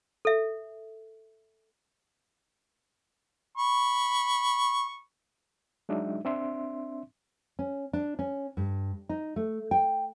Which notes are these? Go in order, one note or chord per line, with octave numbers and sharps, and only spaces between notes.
A4 E5
B5 C#6
F#3 G#3 D4 D#4 E5
C4 D4 E5 C6
C#4
D4
C#4
G2
D#4
A3
G5